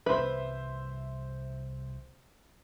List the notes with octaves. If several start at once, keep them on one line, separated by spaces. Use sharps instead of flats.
C2 C3 E3 B4 C5 E5